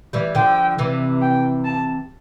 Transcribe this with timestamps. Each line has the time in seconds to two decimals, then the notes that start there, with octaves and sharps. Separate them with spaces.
0.13 E3 G3
0.35 D3 F3 G5
0.78 C3 E3
1.21 G5
1.65 A5